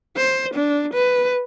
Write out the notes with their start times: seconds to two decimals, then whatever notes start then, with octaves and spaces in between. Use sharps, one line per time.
0.17 C5
0.54 D4
0.94 B4